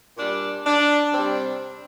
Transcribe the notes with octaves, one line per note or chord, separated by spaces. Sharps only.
A#2 G3 D4
D4
C3 C4
G3